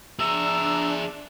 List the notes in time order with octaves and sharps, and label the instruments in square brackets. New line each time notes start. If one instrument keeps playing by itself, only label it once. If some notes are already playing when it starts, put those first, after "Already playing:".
[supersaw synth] D4 [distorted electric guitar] G#4 E5 [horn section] A#5 [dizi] E6